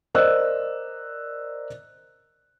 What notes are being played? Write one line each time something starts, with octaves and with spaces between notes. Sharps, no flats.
A#4 C5 D5 D#5 E6 F#6